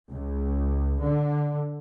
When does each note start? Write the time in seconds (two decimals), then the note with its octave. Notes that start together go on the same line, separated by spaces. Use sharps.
0.11 C#2
1.03 D3